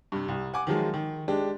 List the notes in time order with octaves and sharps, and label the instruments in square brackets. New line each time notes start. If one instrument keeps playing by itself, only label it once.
[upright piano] G2 C3
C2
F#5 G#5 D6
D#3 F3 F#3 G#3
D#3
G#3 D4 G4